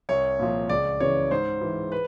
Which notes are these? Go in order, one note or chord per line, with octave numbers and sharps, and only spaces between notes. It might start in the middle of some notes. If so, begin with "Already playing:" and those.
C2 C#5
A#2 F3
C#2 D5
C#3 E3 C#5
G#2 C5
E3
B4